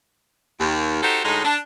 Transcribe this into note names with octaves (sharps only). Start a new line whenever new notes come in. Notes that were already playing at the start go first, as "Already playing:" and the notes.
D#2
D#4 F#4 G4 A4 C5
D2 A2 G#3 D#4
D4